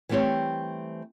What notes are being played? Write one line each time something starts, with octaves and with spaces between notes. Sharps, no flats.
E3 G3 A3 C4 G4 C#5